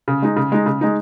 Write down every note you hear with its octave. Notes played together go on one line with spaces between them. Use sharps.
C#3
G#3 D#4
C#3
G#3 D#4
C#3
G#3 D#4